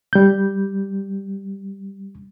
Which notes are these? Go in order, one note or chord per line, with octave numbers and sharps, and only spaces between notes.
G3 G6